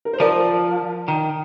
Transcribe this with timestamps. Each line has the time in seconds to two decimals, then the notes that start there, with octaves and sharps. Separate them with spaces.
0.05 A#4
0.13 C5
0.20 F3 A#4 D5
1.08 D#3